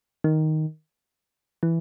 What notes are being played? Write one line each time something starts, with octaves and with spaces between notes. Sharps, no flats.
D#3
E3